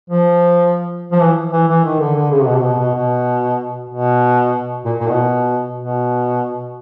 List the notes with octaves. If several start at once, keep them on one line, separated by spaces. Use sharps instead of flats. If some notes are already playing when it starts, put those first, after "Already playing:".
F3
F3
E3
E3
E3
D#3
D3
D3
C#3
C3
B2
C3
B2
B2
B2
B2
A#2
A#2
B2
B2